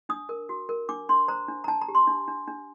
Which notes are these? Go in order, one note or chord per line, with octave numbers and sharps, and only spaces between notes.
D4 D#6
A#4
F#4
A#4
D4 D6
D4 C6
C5 A#5
D4
A#5
D4 A5
A#5
G4
C6
D4
D4
D4